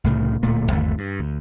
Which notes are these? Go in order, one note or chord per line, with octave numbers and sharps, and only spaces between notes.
C2 A2 C#3
D1 A#2 A3
G1 D#2 D3 A3
G2
D2